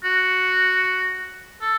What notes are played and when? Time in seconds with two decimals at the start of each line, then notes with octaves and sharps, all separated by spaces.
0.04 F#4
1.62 A4